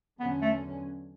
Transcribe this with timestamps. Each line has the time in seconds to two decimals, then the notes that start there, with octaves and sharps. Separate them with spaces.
0.19 E2 D3 F#3 B3 C#4
0.42 A3